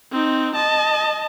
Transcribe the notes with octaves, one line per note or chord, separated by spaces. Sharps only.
C4 D#4
D#5 A5